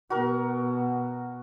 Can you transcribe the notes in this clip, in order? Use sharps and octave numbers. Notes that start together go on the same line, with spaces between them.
B2 F#4 A#4